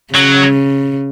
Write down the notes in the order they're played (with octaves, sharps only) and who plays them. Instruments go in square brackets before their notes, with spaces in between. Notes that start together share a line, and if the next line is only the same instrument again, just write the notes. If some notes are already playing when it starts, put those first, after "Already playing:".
[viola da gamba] C#3 [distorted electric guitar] F#3